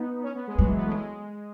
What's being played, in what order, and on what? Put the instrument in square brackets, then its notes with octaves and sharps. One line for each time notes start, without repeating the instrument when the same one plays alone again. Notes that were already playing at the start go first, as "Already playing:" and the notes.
Already playing: [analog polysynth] B3 D#4
C#4
B3
G#3
[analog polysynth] F#3 [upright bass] G#3
[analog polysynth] E3
B3
A3
G#3